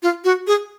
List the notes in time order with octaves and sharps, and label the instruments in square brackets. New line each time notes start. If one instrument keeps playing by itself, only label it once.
[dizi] F4
F#4
G#4